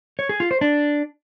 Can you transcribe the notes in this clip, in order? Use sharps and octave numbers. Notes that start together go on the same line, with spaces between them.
C#5
G#4
F4
C5
D4